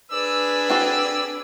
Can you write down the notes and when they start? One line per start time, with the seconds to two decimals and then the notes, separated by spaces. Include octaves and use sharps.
0.12 D4 G#4 B4 D5 E6
0.70 C4 F#4 A4